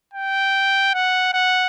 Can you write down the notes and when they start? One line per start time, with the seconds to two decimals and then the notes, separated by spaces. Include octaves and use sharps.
0.14 G5
0.94 F#5
1.33 F#5